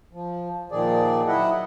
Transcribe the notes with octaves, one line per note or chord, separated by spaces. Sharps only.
F3
A#2 D#3 F3 G#4 D5
F#3 E4 D#5 E5 F#5